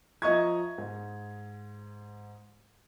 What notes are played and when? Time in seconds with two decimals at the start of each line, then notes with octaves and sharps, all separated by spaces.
0.22 F3 D#5 E5 A#5 C#6 G#6
0.78 G#2